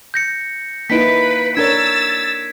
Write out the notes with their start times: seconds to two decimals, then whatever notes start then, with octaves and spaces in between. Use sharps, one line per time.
0.14 G6 A#6 C#7
0.90 A#3 D#4 E4 B4 B6 D7
1.57 D4 A#4 C#5 E6 G#6 A6